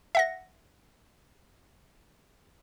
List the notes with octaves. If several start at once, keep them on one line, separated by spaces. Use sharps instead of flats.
E5 F#5 A#6